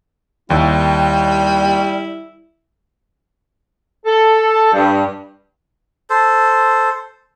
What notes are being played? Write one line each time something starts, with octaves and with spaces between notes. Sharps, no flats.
D#2 G3 E4
A4
G2
A4 C5